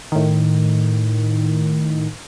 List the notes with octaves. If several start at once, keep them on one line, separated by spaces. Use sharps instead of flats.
A2 D#3